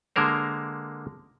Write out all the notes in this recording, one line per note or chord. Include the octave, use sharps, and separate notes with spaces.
D3 G#3 A#3 A#4 C5